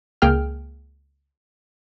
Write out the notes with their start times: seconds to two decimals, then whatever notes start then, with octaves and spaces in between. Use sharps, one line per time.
0.22 C#2 A#3 G#4 G5 F6